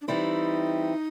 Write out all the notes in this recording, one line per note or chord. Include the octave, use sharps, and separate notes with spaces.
D4
E3 G3 C4 D#4 E4